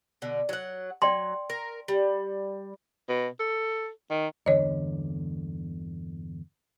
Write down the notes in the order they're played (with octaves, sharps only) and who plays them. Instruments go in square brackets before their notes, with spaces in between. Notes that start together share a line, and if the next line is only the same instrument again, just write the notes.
[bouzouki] B2 D3
F#3 F#5
[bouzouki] F#3 [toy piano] D5 G5 C6
[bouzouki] A#4
G3
[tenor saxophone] B2
A4
D#3
[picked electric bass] G1 E2 D3 [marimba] C#5 D#5